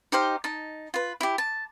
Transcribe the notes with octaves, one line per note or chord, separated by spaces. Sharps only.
D#4 G4 C5 F5
D#4 A5
F4 B4
E4 G4
A5